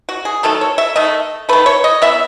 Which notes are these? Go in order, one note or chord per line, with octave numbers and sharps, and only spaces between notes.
F#4
G#4
D#3 F#3 A3 A4
C#5
E5
D#3 A3 D#5
D#3 A3 B4
C#5
D#5
E3 B3 E5